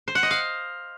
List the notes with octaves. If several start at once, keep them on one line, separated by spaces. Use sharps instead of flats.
C5
F#5
D#5
F5